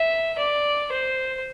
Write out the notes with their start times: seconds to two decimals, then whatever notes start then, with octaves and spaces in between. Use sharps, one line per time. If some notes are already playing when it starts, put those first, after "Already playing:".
Already playing: E5
0.38 D5
0.91 C5